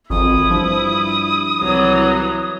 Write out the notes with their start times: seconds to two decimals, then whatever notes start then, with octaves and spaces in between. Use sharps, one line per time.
0.10 G#1 F2 E4 D#6
0.51 G2 F3
1.61 C2 E3 F#3